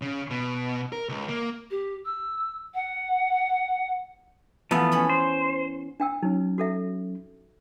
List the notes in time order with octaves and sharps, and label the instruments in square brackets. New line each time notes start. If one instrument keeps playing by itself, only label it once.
[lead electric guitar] C#3
B2
A#4
C#2
A#3
[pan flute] G4
E6
F#5
[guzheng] E2 F5 [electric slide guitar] F3 A3 B3
[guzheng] C#4 C#5 B5
[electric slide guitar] C5
[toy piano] D4 G5 E6
[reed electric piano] F#3 C#4 [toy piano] D#4
[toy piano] F#4 A4 E5